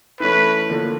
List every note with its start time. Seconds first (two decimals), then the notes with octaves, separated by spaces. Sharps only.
0.20 E3 A3 C#4 B4
0.69 D3 F3 A#3